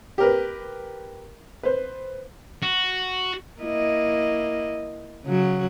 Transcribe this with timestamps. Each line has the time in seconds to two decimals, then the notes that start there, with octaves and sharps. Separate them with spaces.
0.18 G4 A#4 B4
1.63 B4 C5
2.62 F#4
3.61 A#3 E4 D#5
5.25 C#3 F#3 F#4